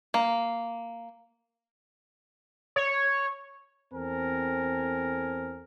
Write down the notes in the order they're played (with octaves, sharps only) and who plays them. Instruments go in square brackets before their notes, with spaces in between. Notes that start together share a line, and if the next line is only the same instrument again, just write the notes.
[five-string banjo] A#3
[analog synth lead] C#5
[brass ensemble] E2 C4 A4 A#4 G#5